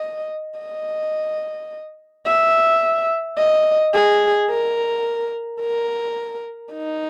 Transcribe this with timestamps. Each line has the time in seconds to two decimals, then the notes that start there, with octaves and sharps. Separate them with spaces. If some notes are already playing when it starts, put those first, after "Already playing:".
Already playing: D#5
0.59 D#5
2.26 E5
3.38 D#5
3.94 G#4
4.50 A#4
5.61 A#4
6.73 D#4